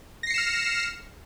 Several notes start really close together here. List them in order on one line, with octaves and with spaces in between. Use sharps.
A#6 C7 C#7 E7 F6